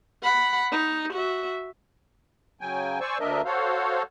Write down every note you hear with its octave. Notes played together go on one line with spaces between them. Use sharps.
F#5 B5
D#4
F#4 E5
C#3 F#3 G5 G#5
C5 D5 G#5 C#6 E6
D2 A#3 D4 A#4 D#5 E5
F#4 A4 C5 C#5 F5